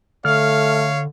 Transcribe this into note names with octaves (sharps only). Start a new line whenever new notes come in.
D3 A3 C#5 F5 F6